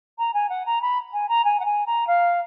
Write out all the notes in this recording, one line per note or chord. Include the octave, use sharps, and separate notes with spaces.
A#5
G#5
F#5
A#5
B5
G#5
A#5
G#5
F#5
G#5
A#5
F5